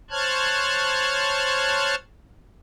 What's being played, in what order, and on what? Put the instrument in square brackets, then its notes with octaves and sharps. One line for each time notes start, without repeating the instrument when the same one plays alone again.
[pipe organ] C5 C#5 A5 F6 F#6 G#6